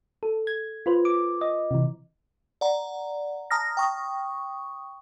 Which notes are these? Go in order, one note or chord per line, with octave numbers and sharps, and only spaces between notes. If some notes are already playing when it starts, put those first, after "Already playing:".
A4
G#6
F4 B4 C5
D6
D#5
C3 E3
D5 F#5 A#5
A5 A#5 D#6 F6 A#6
G5 C#6 D#6